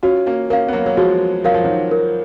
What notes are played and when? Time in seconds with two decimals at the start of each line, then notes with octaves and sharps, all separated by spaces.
0.03 C#4 F4 F#4
0.26 A#3 C#4
0.50 A#3 C#4 A#4 F5
0.68 B3
0.73 F#3 A#3
0.86 F#3
0.97 F3 G#3 F#4
1.44 F#3 A#4 F5
1.54 F3
1.64 D#3 F#3
1.91 A#4